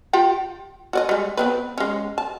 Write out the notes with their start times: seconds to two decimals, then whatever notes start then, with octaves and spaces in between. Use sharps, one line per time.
0.13 F4 G4 G5
0.93 F#4 D5 D#5
1.09 G3 G#3
1.37 B3 C4 B4
1.78 G#3 C#4
2.18 A5